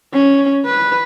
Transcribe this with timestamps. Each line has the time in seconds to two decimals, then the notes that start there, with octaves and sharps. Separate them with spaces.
0.13 C#4
0.66 B4